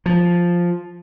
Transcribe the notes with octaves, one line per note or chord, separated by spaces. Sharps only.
F3